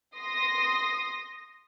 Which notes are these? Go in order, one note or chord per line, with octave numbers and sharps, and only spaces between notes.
C6 D#6 A#6